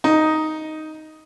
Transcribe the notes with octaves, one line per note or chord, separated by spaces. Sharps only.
D#4